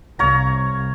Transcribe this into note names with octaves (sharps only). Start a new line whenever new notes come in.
C2 C#5 F5 A#5